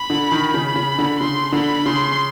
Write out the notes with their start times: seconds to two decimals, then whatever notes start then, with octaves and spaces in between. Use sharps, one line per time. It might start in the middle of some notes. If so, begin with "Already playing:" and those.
Already playing: B5
0.10 D3
0.32 D#3
0.53 C#3 B5
0.76 C#3
0.98 D3
1.19 C#3 C6
1.52 D3 B5
1.86 C#3 C6